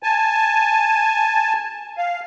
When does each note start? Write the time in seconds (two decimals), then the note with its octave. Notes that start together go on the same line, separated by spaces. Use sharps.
0.03 G#5 A5
1.98 F5